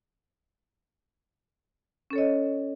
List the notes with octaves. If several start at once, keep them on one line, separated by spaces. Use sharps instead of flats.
C#4 A4 C#5 D#5